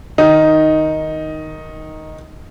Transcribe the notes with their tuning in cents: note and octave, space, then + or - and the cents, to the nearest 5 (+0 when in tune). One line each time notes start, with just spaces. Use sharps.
D#3 +0 D#4 +5